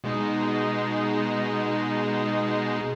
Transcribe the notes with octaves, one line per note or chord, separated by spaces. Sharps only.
B2 G#3 D#4